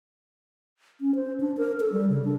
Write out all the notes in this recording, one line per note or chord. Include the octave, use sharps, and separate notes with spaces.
C#4
C5
D4
A#4
A4
G3
C#3
D4